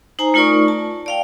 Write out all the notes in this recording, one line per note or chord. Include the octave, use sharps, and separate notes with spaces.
D#4 C5 G#5 A#5
A3 D#4 F4 A#4 D5 C#6
A5
D5 F5 G5